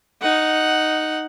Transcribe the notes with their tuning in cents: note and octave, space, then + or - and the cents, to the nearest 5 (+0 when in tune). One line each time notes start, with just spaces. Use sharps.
D#4 +0 F#5 +0